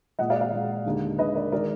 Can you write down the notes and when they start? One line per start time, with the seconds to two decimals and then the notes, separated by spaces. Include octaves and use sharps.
0.19 A#2 G#3 D#5 F#5
0.30 D5 F5
0.41 D5 F5
0.52 A#2 G#3
0.85 D#2 D3 G#3
1.18 D#2 D3 G#3 B4 D#5
1.35 A#4 D5
1.52 D#3 G#3 A#4 D5